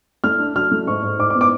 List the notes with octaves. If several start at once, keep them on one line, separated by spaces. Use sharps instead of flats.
A3 F6
D4
F#3 F6
A3
G#2 C#6
G#2
G#2 D6
D6
B3
D6